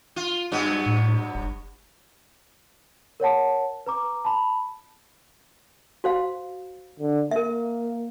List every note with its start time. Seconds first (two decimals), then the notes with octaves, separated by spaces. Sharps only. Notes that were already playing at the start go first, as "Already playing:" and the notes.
0.16 F4
0.52 G2 F#3 B3
0.86 A2
1.35 F#1
3.20 A#4 C#5 F#5 A5
3.86 B4 A#5 D6
4.25 A5 B5
6.04 F#4 C5 F5
6.99 D3
7.31 A#3 A#4 E5